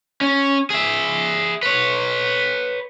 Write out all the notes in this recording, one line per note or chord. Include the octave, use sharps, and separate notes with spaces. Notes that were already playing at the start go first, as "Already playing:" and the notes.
C#4
G#4 E5
B4 C#5